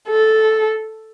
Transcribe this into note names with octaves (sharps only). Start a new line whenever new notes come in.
A4